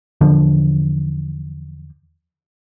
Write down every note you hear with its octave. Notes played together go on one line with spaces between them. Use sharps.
E2 D3 F3